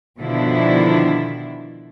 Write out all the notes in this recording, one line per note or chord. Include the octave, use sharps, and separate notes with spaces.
B2 D3 D#3 F3 D4 E4